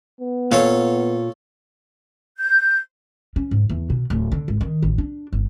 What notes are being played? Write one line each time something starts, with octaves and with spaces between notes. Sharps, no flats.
B3
A#2 A4 C#5 F5
G6
C#4
G#2
E2
B2
D1
D3
G#1
D#3
A1
D4
G1